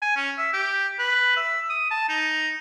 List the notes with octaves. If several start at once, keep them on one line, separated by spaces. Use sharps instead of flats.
G#5
C#4
E5
G4
B4
E5
D#6
A5
D#4